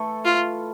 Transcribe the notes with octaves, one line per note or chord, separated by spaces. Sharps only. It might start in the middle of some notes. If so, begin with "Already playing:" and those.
Already playing: E3 A3 E4 A4
F4